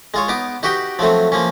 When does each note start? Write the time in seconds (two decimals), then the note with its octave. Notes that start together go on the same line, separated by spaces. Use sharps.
0.14 G#3 F4 C#5
0.28 B3 D#4 D6
0.63 D#4 F#4 G4 B4 G5
0.99 F3 F#3 A3 C4
1.32 F3 A#3 C#4